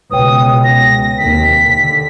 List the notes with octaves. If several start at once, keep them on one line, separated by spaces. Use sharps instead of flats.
C#2 B2 B4 C#5 G5 D#6
A#6
D#2 C3 G5 B6
D3